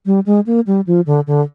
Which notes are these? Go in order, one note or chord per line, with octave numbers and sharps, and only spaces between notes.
G3
G#3
A#3
G3
F3
D3
D3